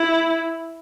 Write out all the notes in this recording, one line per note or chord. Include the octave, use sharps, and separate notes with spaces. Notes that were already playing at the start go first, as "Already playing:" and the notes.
Already playing: E4